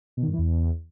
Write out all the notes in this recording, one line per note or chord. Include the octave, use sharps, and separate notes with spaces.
B2
D#3
G2
E3
E2